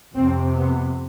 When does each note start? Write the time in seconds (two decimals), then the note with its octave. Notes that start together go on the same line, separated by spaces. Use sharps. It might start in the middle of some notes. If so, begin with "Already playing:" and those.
0.15 F2 C3 C4
0.57 B3